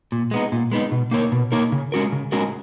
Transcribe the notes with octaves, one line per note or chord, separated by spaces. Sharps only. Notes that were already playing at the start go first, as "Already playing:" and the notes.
A#2
G#3 B3 D#4
A#2
G#3 B3 D#4
B2
A#3 D#4 A#4 C#5
B2
A#3 D#4 A#4 C#5
C#3
G#3 C#4 F#4 A#4
C#3
G#3 C#4 F#4 A#4